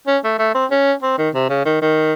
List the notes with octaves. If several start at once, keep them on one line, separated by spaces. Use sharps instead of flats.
C#4
A3
A3
C4
C#4
C4
D#3
C3
C#3
D#3
D#3